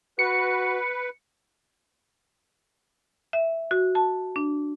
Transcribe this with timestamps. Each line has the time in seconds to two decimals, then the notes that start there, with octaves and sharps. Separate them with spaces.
0.19 F#4 B4 C#7
3.33 E5
3.71 F#4
3.95 A5
4.36 D4